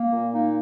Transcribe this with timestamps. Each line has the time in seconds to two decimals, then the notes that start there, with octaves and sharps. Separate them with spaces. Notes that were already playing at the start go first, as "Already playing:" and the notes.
Already playing: A#3
0.11 A#2
0.33 A#3 D#4